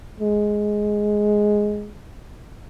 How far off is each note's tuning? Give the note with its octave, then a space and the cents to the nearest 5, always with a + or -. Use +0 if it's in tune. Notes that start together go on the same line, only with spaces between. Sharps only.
G#3 +5